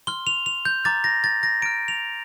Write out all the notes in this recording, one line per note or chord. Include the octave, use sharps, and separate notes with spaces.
C6 F6 G7
F7
F7
G6
A#5 D6 F6 A6
A#6
A6
A#6
A#5 F6 D7
F7